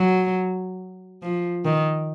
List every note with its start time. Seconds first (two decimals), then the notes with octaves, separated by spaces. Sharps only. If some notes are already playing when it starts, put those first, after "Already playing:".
Already playing: F#3
1.22 F3
1.65 D#3